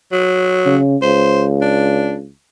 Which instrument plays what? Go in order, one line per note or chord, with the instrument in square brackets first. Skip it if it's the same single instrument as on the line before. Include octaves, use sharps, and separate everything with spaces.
[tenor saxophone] F#3
[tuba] C#3
[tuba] C#2 [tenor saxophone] C5
[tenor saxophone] D4